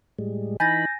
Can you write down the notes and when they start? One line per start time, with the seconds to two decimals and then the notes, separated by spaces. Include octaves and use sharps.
0.19 A2 G3 G#3
0.60 E3 D#4 G#5 B5 G6 A6 A#6